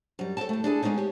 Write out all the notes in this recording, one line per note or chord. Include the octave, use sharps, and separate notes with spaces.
F#2 G3
A4 C#5 F#5 G5 A5
A2 A3
D4 E4 G#4 A4
G#3 A#3 B3 C#4 D#4
G4 C#5